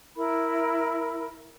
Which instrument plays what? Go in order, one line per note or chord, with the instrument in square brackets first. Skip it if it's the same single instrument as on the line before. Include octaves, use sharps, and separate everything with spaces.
[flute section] E4 A#4 B5